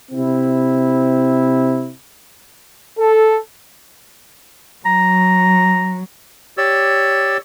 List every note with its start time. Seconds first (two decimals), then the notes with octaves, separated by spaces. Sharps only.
0.11 C3 C4 E4
2.99 A4
4.85 F#3 A#5
6.57 G4 C#5 D5 E6